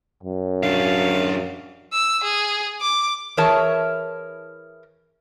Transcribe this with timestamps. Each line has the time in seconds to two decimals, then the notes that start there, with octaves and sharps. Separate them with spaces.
0.23 F#2
0.63 F#3 D4 F5
1.93 E6
2.24 G#4
2.81 D6
3.37 E3 G#4 A#4 C#5 E5 A5